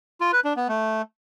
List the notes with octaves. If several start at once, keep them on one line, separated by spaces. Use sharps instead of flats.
F4
B4
D4
B3
A3